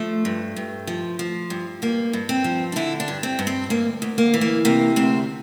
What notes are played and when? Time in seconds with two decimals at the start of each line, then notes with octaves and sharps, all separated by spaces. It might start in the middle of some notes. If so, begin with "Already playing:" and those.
Already playing: F3 A3
0.25 G2
0.56 G2
0.87 F3
1.19 F3
1.50 G2
1.82 G2 A#3
2.13 G2
2.29 C4
2.44 F3
2.72 D4
2.76 D3 E4
3.00 D4
3.08 G2
3.23 C4
3.39 G2
3.47 C4
3.70 D2 A#3
4.02 D2
4.18 A#3
4.34 E3
4.41 A#3
4.65 C3 A#3
4.96 D2 C4